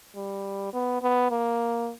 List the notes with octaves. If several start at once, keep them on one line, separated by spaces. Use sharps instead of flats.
G3
B3
B3
A#3